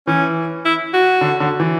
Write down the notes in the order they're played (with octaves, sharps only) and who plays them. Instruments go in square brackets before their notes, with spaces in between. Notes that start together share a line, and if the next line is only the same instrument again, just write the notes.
[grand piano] E3 [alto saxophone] C#4
[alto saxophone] E4
F#4
[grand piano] D3
D3
E3